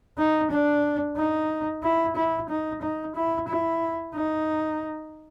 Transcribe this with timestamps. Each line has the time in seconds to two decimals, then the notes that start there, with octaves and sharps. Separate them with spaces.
0.18 D#4
0.51 D4
1.17 D#4
1.83 E4
2.16 E4
2.49 D#4
2.82 D#4
3.15 E4
3.48 E4
4.14 D#4